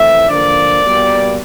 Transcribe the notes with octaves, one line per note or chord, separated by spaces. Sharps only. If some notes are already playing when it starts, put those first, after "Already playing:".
Already playing: A2 E3 A3 C4 E5
D3 F3 A#3 D5
B2 G3 A#3